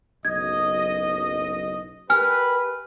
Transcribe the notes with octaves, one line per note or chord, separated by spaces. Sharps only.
F#1 B1 D#5 G#6
G4 A#4 B4 G#5 F6